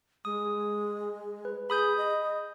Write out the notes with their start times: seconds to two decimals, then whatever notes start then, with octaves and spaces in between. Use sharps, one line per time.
0.25 G#3 D#6
1.45 B4
1.70 G#4 B5 D#6 G6
1.97 D#5